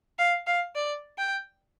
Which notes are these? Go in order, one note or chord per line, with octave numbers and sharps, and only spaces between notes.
F5
F5
D5
G5